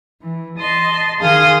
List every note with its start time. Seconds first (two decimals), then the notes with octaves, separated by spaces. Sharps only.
0.23 E3
0.58 D#5 A5 C6
1.21 D#3 G#4 F5 C6 D#6 F6